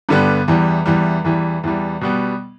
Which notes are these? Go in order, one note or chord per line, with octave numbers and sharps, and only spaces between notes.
G2 D3 G3 B3
E2 E3 G3
E2 E3 G3
E2 E3 G3
E2 E3 G3
B2 G3 B3